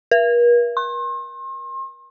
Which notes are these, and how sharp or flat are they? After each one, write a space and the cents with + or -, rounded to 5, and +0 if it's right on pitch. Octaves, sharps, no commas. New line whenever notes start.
A#4 +45
C6 +40